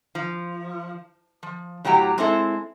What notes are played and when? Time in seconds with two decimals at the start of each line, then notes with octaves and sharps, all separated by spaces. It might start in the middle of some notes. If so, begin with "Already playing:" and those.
0.15 F3
1.43 F3
1.85 A2 F#3 G4 G5 A#5
2.18 G#3 C4 E4 A4